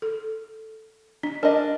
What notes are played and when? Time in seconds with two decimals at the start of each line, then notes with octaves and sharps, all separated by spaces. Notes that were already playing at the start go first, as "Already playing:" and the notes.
0.02 A4
1.23 D4
1.43 D4 A#4 D#5